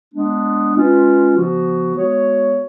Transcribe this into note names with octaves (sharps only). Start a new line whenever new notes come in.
G#3 B3 D4
G#3 C#4 F4 B4
C#3 F3 B3 F#4
G#3 B3 F#4 C#5